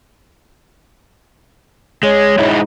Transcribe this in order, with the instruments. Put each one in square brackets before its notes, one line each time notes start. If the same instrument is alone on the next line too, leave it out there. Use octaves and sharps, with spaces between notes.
[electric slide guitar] G#3 [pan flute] C#5
[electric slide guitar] G#3 D#4 E4